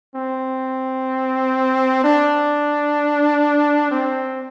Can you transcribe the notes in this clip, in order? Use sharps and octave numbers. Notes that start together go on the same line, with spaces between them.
C4
D4
C4